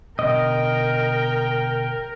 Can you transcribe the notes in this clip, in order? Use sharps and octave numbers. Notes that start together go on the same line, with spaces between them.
B2 D3 A#4 D#5 G5